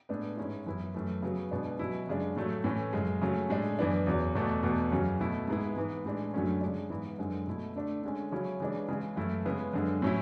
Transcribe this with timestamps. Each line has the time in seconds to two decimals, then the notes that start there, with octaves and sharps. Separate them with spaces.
0.09 A2 G#3 B3 D4
0.37 G#2 G#3 C#4 E4
0.66 F#2 E3 B3 E4
0.94 F#2 E3 A3
1.22 C#3 F#3 B3
1.51 B2 G#3 B3 D4
1.79 B2 F#3 C#4 E4
2.07 F#2 C#3 G#3 D4
2.36 A2 F#3 A3
2.64 A2 E3 A3 C#4
2.93 F#2 C#3 G#3
3.22 C#3 F#3 A3 C#4
3.50 A2 G#3 D4
3.79 F#2 E3 B3 D4
4.07 E2 C#3 F#3
4.35 E2 B2 A3
4.63 E2 B2 A3
4.92 F#2 C#3 F#3 C#4
5.20 B2 A3 E4
5.48 G#2 G#3 B3 E4
5.76 G#2 E3 B3
6.06 A2 E3 G#3 D4
6.34 F#2 D3 F#3 A3 C#4
6.61 C#3 G#3 D4
6.90 G#2 E3 B3 E4
7.19 F#2 D3 G#3
7.47 B2 A3 E4
7.75 D3 A3 D4
8.03 D3 G#3 C#4
8.32 C#3 F#3 C#4 E4
8.60 C#3 E3 G#3 D4
8.88 C#3 E3 G#3
9.16 F#2 E3 A3 E4
9.45 C#3 G#3 B3 E4
9.73 F#2 D3 G#3
10.02 A2 F#3 C#4 E4